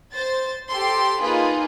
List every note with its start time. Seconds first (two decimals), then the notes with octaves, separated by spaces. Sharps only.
0.13 C5 A6
0.69 G4 A4 C6
1.21 A#3 D#4 F4 G#4 B4